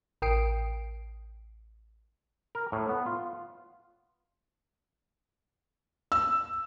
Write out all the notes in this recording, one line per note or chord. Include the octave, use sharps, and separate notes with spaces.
A1 A#4 G5 D#6 C7 D7
A#4
A2
B3
F4
E6